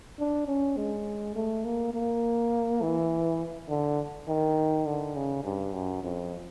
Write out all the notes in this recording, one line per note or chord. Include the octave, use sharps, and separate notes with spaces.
D4
C#4
G#3
A3
A#3
A#3
E3
D3
D#3
D3
C#3
G2
F#2
F2